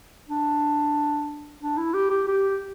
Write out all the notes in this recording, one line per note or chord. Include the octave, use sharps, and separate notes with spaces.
D4
D4
E4
G4
G4
G4